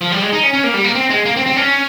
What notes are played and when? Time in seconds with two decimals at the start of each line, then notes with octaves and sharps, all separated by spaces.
0.01 F3
0.12 G3
0.22 G#3
0.33 D#4
0.43 C#4
0.53 C#4
0.64 A#3
0.74 G3
0.84 A#3
0.95 C4
1.10 G#3
1.25 A#3
1.36 C4
1.46 C4
1.56 C#4